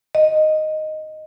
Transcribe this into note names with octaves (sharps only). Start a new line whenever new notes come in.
D#5